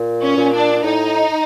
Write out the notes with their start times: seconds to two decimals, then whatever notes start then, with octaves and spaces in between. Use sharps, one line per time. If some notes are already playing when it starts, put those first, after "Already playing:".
Already playing: A#2
0.22 C#4
0.37 A#2
0.53 D4
0.84 A2 D#4